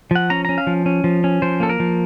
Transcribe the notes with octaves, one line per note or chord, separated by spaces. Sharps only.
F3 F#5
C#4 A#5
C#4 A#5
F5
F3
C#4
F3
C#4
F3 C5
A#3 A4
A#4
F3